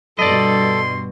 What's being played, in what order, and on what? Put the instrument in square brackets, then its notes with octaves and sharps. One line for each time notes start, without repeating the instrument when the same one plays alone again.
[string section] G2 B2 [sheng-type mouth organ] A4 [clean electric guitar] D5 D#5 [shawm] C6